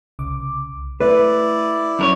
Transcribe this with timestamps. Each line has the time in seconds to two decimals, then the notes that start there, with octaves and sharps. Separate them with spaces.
0.19 C2 C#3 D6
1.00 A3 E4 B4 D5
1.99 F#2 A#4 C#5